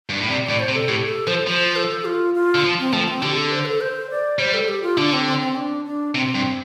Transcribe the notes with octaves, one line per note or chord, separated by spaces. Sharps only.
G2
A2
C3 D5
A2 D5
C5
C3
A4
A2 G4
A4
F3 C5
F3 C5
A4
F4
F4
D3
F3
C4
F3 A3
C4
D3 G4
A4
C5
A4
C5
D5
G3 C5
A4
G4
F4
D3 D4
C4
C4
C4
D4
D4
C3 C4
G2